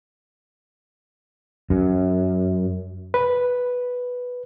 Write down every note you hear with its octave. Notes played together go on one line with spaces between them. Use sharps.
F#2
B4